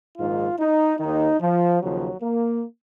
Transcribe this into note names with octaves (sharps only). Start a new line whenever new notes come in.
A#1 G#2 D#3 F4
D#4
D#2 D#3 D#4
F3
D#2 C#3 F3 F#3
A#3